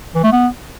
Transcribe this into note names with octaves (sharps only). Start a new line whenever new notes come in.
E3
A3
B3